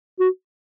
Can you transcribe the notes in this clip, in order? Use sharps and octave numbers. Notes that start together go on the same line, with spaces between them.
F#4